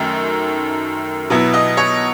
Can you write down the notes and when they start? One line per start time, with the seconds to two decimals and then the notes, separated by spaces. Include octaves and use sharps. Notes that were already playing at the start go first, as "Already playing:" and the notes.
Already playing: F#2 D#3 A3
1.30 B2 F#3 B3 E4
1.54 D#5
1.77 C#5